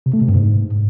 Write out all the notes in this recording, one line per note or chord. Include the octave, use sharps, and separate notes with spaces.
C3
A3
C3
G2
G#2